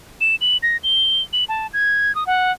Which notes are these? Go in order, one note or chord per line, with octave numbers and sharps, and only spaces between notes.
E7
F#7
A#6
G7
F#7
A5
G#6
D#6
F#5